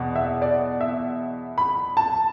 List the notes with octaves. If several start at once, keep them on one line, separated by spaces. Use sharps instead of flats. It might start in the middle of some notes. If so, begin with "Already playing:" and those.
Already playing: E2 B2 B3
E5
D5
E5
B5
A5